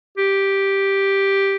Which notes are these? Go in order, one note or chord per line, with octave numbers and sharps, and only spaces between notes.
G4